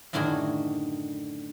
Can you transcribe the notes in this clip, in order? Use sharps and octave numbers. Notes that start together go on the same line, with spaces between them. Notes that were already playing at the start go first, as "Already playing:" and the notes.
F#2 A2 D3 D#3 F#4 G#4